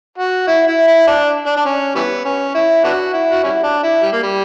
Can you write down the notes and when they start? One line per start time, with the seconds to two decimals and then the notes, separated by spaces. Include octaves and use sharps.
0.18 F#4
0.47 E4
0.67 E4
0.87 E4
1.07 D4
1.47 D4
1.57 D4
1.66 C#4
1.95 E3 G3 B3
2.25 C#4
2.55 E4
2.84 B3 D4 F#4
3.14 E4
3.32 F#4
3.44 G3 C#4 E4
3.63 D4
3.83 E4
4.02 G3
4.13 A#3
4.23 G3